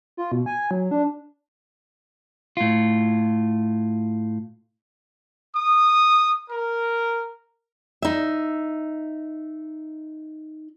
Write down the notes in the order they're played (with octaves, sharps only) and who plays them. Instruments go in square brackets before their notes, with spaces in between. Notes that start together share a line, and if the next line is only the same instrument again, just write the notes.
[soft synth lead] F4
B2
G#5
F#3
D4
[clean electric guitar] A2 F4
[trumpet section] D#6
A#4
[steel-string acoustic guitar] D#4 E5